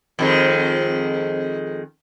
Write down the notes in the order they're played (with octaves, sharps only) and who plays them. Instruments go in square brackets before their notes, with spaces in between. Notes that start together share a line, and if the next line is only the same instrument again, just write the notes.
[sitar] F2 D#3 G#3